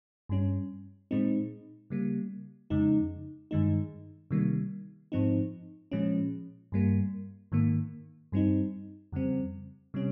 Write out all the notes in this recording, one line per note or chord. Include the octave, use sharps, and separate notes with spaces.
G2 G3 C#4
A#2 G#3 C4 D#4
C#3 G3 A#3
F2 C#3 G#3 D#4
G2 D#3 G#3 D#4
C3 D#3 G3 A#3
G#2 F3 C4 D#4
A#2 F3 G#3 C#4
G2 G3 A#3
G#2 D#3 A#3
G2 G3 C4 D#4
F2 C#3 G3 C4
C3 G3 C#4